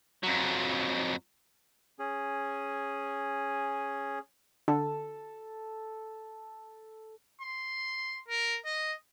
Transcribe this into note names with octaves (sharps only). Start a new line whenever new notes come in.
F2 F#3
C#4 G#4
D3 A4
C6
A#4
D#5